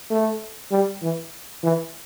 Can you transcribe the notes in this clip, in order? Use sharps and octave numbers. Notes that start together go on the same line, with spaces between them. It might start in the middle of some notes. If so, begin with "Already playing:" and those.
A3
G3
E3
E3